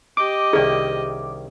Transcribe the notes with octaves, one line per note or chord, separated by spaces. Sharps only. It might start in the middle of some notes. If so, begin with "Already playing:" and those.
G4 D#5 D6
C2 D#3 C#4 G#4 D5